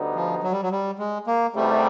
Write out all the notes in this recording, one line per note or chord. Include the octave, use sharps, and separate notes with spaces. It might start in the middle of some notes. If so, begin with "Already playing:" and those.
Already playing: D2 D3 G3 B3 D#4
F3
F#3
G3
F#3
G3
G#3
A#3
E2 C3 D#3 G3 A3